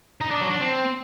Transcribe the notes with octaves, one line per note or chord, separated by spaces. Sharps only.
D#4
D4
F#3
D4
C4